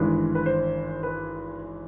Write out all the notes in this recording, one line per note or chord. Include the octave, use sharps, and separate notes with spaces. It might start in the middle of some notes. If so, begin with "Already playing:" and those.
Already playing: G#1 G2 E3 G#3 B4
B4
C5
B4